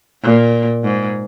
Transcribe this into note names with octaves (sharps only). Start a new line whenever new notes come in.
A#2
G#2